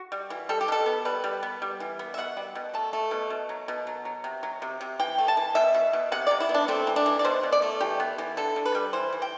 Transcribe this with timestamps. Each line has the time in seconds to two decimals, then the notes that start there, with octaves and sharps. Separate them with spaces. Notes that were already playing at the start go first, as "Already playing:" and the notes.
Already playing: F#4
0.12 G3
0.30 E3
0.49 G3 A4
0.61 G4
0.68 B2 A4
0.86 B3
1.05 G3 B4
1.24 G3
1.43 B3
1.62 G3
1.80 E3
1.99 B3
2.14 E5
2.18 B2 F#5
2.37 G3
2.55 B2
2.74 A3 A5
2.93 A3
3.11 B2
3.30 B2
3.49 F#3
3.68 B2
3.87 F#3
4.05 F#3
4.24 C3
4.43 F#3
4.62 C3
4.81 C3
4.99 E3 G5
5.18 A3
5.28 A5
5.37 E3
5.55 B2 E5
5.74 B2
5.93 B2
6.12 C3 F#5
6.27 C3 D5
6.40 E4
6.49 B3
6.54 D4
6.68 A3 C4
6.87 E3
6.96 D4
7.06 E3
7.19 D5
7.25 B2 C5
7.43 B2
7.53 D5
7.62 A3
7.80 E3 G4
8.00 B3
8.18 E3
8.37 D3 A4
8.56 D3
8.65 B4
8.75 G3
8.93 E3 C5
9.13 E3
9.22 G5